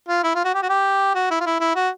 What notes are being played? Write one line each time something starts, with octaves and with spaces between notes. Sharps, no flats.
F4
E4
F4
F#4
G4
F#4
G4
F#4
E4
F4
E4
E4
F#4